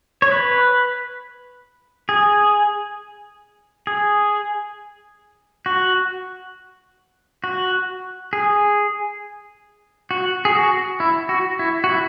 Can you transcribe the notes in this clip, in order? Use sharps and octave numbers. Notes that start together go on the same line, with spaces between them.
C#5
B4
G#4
G#4
F#4
F#4
G#4
F#4
G#4
F#4
E4
F#4
E4
F#4
E4